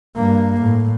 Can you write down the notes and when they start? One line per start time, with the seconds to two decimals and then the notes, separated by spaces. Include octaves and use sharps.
0.16 G2 A#3
0.61 A2